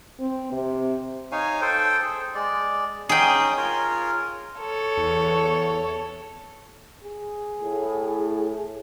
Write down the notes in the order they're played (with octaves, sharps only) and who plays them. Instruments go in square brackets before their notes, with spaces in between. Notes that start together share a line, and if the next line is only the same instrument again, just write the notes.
[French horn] C4
C3
[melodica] D#4 C#5 F5 G#5
A4 C5 G5
G#4
G#3 D5
[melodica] C#4 D#4 D#6 [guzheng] G#4 G5
[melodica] F4 A#4 C#5
[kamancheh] A4 C#5
[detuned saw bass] E2
[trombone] G#4
[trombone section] A2